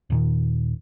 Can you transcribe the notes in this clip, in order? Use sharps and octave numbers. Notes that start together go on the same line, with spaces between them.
D#1 A#2 D#3